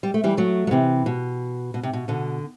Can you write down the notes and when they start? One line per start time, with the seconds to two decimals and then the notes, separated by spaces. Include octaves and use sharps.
0.03 G3
0.14 A3
0.24 E3 G3
0.37 F#3 A3
0.67 F#3
0.71 C3 E3
1.06 B2
1.74 B2
1.83 C3
1.93 B2
2.08 B2 D3